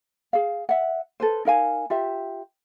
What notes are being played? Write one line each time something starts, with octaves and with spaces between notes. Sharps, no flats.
G#4 F5
E5 F#5
A4 B4 C5
D#4 A#4 F5 G#5
F4 G4 E5